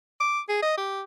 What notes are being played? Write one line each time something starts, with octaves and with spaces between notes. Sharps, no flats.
D6
G#4
D#5
G4